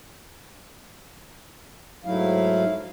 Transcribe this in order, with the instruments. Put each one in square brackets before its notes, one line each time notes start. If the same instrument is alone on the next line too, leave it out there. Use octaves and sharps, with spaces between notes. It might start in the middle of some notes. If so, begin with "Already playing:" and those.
[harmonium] G#2 F#3 A3 E4 F5